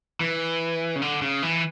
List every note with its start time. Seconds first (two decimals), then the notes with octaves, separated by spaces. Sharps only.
0.21 E3
0.96 C#3
1.02 D3
1.22 C#3
1.43 E3